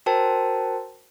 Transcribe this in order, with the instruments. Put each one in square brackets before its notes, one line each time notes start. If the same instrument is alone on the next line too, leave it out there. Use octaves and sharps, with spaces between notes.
[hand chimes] F#4 A#4 C5 G5 A5